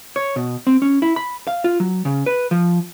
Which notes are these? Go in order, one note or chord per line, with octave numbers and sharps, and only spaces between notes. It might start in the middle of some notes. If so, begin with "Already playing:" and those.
C#5
B2
C4
C#4
E4
B5
F5
F4
F#3
C#3
B4
F3